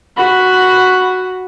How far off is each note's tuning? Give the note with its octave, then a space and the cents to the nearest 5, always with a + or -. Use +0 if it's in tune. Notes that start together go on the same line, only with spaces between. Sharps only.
F#4 +0 B5 +5